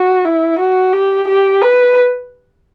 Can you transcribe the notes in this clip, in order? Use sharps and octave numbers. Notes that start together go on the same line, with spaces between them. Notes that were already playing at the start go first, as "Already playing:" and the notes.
Already playing: F#4
E4
F#4
G4
G4
B4